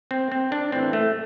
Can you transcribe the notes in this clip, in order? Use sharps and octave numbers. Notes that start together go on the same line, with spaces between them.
C4
C4
D4
A2 E3 C4
A3